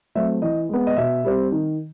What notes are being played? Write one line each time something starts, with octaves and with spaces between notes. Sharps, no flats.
F#3 A3 C4 E5
E3 D#5
G#3 B3
D#5
B2 E5
G3 C4
D#3